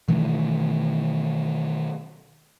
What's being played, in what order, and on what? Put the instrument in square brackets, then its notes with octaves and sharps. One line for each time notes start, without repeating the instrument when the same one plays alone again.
[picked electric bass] B2 D#3 E3 A3